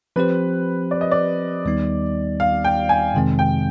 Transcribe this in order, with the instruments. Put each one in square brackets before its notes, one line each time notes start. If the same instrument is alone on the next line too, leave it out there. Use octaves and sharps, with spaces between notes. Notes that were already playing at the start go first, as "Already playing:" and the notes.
[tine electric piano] F3 C4 G4 C5 [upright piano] B4
[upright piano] D5
D#5
D5
[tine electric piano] D#2 D#3 G3 B3 D#4
[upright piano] F5
G5
G#5
[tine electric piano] F2 C3 D#3 G#3 C4
[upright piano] G5